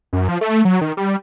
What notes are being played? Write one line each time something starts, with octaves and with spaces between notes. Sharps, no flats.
F#2
F3
A3
F#3
D#3
G3